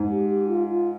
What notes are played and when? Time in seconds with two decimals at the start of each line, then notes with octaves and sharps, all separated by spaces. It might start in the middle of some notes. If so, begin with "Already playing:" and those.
Already playing: G#2
0.10 G4
0.29 G4
0.48 F4
0.68 F4